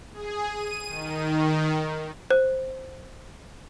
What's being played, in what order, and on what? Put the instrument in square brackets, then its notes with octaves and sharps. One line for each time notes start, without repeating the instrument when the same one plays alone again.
[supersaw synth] G#4
D#7
D#3
[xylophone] C5